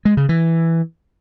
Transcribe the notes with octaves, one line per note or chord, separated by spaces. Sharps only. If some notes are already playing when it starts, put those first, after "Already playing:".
G#3
C#3
E3